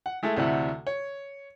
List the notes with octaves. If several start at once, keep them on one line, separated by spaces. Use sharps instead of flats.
F#5
G#3 A3 E4 A4
D2 C3 E3 A3 E5 F#5
C#5